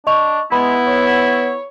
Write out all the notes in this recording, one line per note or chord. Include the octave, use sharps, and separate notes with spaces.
D4 D#5 C#6 F7
G#3 B3 E4 B5
C#5